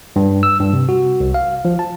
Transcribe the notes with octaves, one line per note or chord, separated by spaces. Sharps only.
G2
E6
G2
C3
F#4
C2
F5
F3
A5